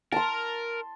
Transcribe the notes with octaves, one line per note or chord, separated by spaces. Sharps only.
A#4 A5 C6